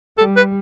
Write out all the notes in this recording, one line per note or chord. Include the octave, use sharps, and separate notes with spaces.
G3 A4
B4